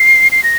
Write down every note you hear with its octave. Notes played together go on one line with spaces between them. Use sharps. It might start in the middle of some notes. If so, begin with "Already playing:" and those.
Already playing: C7
C7
A#6